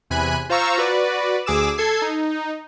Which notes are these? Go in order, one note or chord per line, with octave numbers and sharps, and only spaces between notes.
E2 C3 G#5 B5 F#6
F4 C5 F5 A#5 C#6 E6
F#4 B4 D5
D2 G#4 D6 E6 E7
A4 G#6 C7
D#4